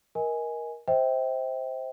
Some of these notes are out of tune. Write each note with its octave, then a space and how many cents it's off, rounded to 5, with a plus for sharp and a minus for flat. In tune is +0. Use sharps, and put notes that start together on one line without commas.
A#4 +20 D#5 +20 G#5 +0
C5 +0 E5 -35 G5 +0